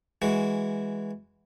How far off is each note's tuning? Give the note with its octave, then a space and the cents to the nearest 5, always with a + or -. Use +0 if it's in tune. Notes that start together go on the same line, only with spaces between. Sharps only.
E3 +0 G#3 +0 F#4 +5